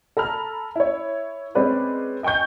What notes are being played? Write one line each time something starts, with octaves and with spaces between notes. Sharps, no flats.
A4 A#5 B5 F6
E4 C#5
G#3 C4 C#4 B4 D5
D#5 G5 G#5 C#6 G6